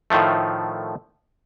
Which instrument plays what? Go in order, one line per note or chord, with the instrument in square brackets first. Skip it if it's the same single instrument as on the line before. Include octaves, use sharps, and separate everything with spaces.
[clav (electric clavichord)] A2 D#3 F3 A3